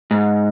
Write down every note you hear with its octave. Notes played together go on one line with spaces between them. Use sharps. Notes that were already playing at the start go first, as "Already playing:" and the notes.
G#2